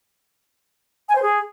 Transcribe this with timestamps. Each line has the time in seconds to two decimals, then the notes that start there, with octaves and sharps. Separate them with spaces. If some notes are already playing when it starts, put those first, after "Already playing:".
1.08 G#5
1.15 C5
1.22 G#4